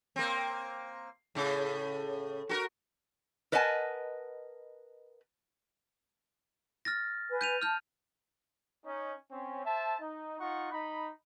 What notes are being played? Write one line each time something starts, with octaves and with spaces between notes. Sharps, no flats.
A#3 C4
A2 C#3
F#4 A4 A#4
A#4 B4 D#5 F#5 G#5 A5
F6 A6 A#6
B4 G#5
G6 D#7 F7
A5 F6 G6
C#4 D#4
C4 C#4
C5 E5 A5
D#4
D#4 F4 F#5 C#6
D#4 B5